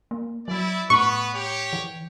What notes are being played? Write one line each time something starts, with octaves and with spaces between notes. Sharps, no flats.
A#3
F#3 E4 D5
A2 B3 B4 C#6
G4 C#5
E3